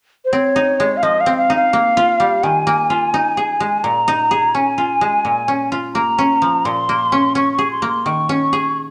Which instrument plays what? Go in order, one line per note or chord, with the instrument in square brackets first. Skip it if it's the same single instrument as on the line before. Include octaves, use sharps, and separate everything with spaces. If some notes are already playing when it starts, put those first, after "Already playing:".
[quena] C5
[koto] C4 [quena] C#5
[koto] D#4
G#3
[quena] F5
[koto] F3 [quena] D#5
[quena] F5
[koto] C4
[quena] F5
[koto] D#4
[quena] F5
[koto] A#3
F4
G3
[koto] D#3 [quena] G#5
[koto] A#3
F4
D#4
G#4
G#3
[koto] A#2 [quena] A#5
[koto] D#4
G#4
[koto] C#4 [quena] G#5
[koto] F4
G#3
A#2
C#4
F4
[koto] A#3 [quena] A#5
[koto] C#4
F3
[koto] A#2 [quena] C6
[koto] A#3
C#4
[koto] C#4 [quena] C#6
[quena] C#6
[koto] G#4
[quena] C6
[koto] A#3
[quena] C6
[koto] D#3 [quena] C#6
[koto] C#4
G#4